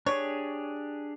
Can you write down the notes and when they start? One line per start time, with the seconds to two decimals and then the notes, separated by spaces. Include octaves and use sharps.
0.06 D4 G4 G#4 C#5